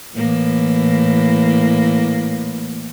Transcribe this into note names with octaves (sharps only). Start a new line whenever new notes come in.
A2 E3 A#3